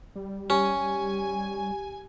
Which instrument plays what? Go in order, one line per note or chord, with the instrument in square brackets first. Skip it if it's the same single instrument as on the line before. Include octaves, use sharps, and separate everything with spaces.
[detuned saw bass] G3
[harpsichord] C#4 [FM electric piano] G4 [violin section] G#5